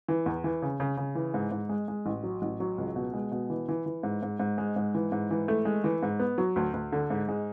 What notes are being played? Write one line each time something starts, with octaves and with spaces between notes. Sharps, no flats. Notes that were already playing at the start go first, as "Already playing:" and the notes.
E3
E2
E3
C#3
C#3
C#3
E3
G#2
G#2
G#3
G#3
A1
F#3
A1
F#3
C#2
B2
G#3
B2
E3
E3
E3
G#2
G#2
G#2
G#3
G#2
E3
G#2
E3
A3
G#3
E3
G#2
B3
F#3
D2
D2
D3
G#2
G#3